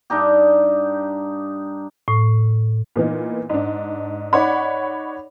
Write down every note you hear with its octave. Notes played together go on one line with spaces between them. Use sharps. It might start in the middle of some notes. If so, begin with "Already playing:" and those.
G2 D4 D#4 G4
A2
A#2 E3 B3 D#4
G#2 D4
D#4 C#5 D5 F#5 B5